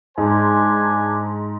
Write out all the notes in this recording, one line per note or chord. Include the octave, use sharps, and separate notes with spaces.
G#2 D4 C5 G#5